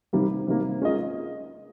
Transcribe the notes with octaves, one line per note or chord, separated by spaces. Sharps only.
C3 D#3 G3 A#3
C3 D#3 G3 A#3
G#3 C#4 F4 A#4 D#5